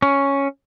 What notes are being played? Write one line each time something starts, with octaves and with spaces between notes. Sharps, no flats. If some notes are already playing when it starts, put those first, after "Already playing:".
C#4